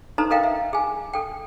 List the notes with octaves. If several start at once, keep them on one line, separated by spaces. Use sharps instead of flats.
D#4 A4 B4 C5 A#5
A4 A#4 D#5 F5 G5
E5
G#4 G#5
A4 G5